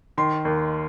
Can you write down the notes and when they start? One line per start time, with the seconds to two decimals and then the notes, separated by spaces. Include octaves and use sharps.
0.18 D#3 C6
0.45 D#2